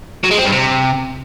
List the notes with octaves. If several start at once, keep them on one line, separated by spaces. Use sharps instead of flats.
F#3
G#3
C4
G2
C3